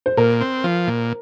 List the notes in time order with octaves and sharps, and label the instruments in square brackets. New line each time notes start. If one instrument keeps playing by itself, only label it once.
[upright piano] C5
[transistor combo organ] A#2 [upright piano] A#4
[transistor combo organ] C4
F3
A#2